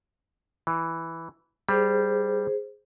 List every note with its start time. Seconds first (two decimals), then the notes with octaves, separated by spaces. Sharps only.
0.67 E3
1.69 G3 G#4 C5